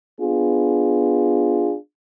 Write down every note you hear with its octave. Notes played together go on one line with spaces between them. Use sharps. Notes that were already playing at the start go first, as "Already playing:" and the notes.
B3 D4 F4 G#4